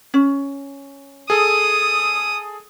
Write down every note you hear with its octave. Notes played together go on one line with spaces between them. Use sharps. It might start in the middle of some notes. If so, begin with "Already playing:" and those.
C#4
G#4 A4 D#6